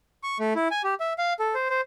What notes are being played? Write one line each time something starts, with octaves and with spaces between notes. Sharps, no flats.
C#6
A3
E4
G#5
G4
E5
F5
A4
C5
C5